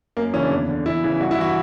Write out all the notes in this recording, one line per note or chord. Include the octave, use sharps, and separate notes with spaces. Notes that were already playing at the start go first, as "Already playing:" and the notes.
F#2 A#3
C#3 E3 C#4
D4
E2
D3
E2 E4
C#3 E3
G2 F#4
E4
E3 F#4